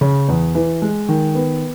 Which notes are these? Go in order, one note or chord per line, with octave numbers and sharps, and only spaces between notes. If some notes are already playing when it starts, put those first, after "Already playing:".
C#3
E2
E3
G#3
D#3
B3